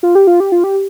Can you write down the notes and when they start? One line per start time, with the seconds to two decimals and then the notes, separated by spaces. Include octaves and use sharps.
0.03 F4
0.15 G4
0.27 F4
0.40 G4
0.52 F4
0.64 G4